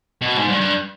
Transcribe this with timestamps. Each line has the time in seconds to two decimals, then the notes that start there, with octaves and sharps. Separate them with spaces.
0.21 B2
0.37 G#2
0.48 G2
0.60 G2